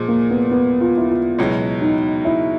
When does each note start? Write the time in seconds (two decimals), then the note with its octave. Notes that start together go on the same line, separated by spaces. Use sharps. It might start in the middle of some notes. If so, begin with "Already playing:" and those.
Already playing: A#2 F3 G#3
0.08 A#3
0.31 B3
0.51 B3
0.81 F4
0.97 E4
1.09 F4
1.38 C#2 B2 F#3 E4
1.82 D#4
2.25 E4